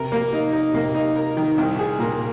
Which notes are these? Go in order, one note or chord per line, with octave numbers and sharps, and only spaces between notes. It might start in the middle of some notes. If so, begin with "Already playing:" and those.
Already playing: C3 A#4
A#3
D#4
D#4
C3 A#3
D#4
A#4
D#3
C2 C3
G#4
A#2 A#3